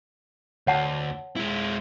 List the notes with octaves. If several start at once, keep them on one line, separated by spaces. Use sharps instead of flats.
D2 C#5 F#5 A5
G#3 E4